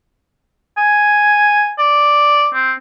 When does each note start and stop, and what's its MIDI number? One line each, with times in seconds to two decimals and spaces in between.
0.77 1.72 80
1.78 2.49 74
2.54 2.73 60